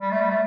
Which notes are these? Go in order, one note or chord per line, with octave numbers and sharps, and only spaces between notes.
G3
A3
G3
A3